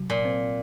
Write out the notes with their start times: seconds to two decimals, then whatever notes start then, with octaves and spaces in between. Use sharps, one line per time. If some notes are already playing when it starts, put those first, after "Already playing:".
Already playing: C3 F#3
0.10 A#2
0.25 C4